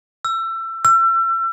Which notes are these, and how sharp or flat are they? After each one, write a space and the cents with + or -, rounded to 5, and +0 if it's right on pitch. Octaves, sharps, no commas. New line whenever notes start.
E6 +25
E6 +35